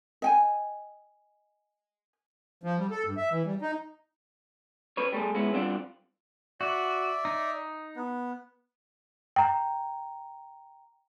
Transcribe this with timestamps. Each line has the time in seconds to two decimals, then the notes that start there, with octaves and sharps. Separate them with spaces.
0.22 D#5 G5 G#5
2.63 F3
2.78 G3
2.91 A4
3.05 G2
3.17 E5
3.31 E3
3.45 G3
3.61 D#4
4.97 C#4 B4 C#5
5.12 G3 A3 G#4
5.35 G#3 B3 C#4 E4
5.53 G3 C4 D4 F4 D5 F#5
6.61 F#4 D5 E5
7.25 D#4
7.96 B3
9.36 G5 A#5